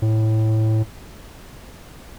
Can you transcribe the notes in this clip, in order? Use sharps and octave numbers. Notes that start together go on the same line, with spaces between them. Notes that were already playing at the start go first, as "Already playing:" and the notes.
A2